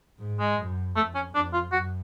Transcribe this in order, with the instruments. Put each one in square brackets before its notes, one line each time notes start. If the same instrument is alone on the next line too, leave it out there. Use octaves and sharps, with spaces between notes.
[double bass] G#2
[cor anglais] G#3
[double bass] F#2
[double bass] F2 [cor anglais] A3
[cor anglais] C#4
[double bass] F2 [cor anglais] D4
[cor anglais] F4
[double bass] F#2 [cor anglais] F#4